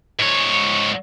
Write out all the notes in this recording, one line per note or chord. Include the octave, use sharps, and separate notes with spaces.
G#2 C#5